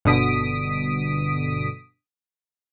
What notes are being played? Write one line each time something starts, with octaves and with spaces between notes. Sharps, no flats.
G1 B2 D3 D#6 B6 D7